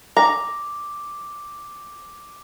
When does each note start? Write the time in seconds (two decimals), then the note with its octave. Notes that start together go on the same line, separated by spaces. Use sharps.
0.17 A#5 D6